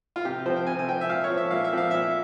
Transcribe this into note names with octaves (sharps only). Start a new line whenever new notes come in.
F4
C3 G4
F3 C4 C5
G5
C3 G#5
G#5
F3 C4 G5
E5
A#2 F5
C#5
F3 C4
E5
A#2 F5
E5
F3 C4 F5
A#2 E5